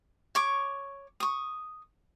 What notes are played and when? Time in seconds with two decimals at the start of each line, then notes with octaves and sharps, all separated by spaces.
0.35 C#5 C#6 D6
1.20 C#6 D#6